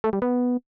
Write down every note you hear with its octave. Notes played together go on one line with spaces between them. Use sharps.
A3
G3
B3